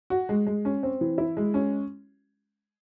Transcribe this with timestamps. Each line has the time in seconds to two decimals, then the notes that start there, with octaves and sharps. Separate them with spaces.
0.10 F#4
0.29 G#3
0.47 G#3
0.65 C#4
0.83 C4
1.01 E3
1.18 E4
1.37 G#3
1.54 C#4